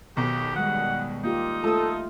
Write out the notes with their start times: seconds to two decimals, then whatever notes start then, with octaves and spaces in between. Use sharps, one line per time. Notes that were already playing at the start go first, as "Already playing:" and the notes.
0.17 B1 B2 D#3 G4
0.56 D#3 G3 G#3 F#5
1.24 A#3 D#4 F4 G4
1.64 A3 F4 A4 A5 D#6